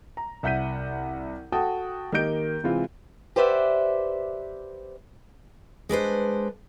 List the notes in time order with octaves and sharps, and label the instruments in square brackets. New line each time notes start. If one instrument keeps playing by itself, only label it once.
[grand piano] A#5
C2 E5 F#5 G6 B6 D#7
F#4 A4 G5 A5 D#6
D#3 A#3 G4 D#5 G6 D7
C3 E3 G#3 C4 F4
[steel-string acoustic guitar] G4 B4 C5 D5 E5 F#5
G#3 D4 B4 C5